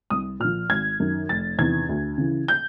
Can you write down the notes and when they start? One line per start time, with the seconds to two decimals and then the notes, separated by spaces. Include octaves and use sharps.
0.10 C2 D#6
0.40 A#2 F6
0.45 F3
0.70 G#1 G#6
1.00 F#2 D#3
1.29 F1 A6
1.58 E2 C3 D#3 G#6
1.89 D2
2.18 C#3 E3
2.48 G6